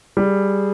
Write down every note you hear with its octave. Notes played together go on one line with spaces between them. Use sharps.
G3 G#4